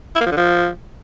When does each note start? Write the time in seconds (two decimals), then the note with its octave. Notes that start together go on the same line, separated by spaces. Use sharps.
0.15 E4
0.21 A#3
0.26 F3
0.32 D3
0.37 F3